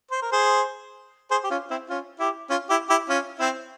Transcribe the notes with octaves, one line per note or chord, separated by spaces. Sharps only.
C5
A#4
G#4 C5
G#4 C5
G4
C#4 F4
C4 E4
C#4 F4
E4 G4
C#4 F4
E4 G4
E4 G4
C#4 F4
C4 E4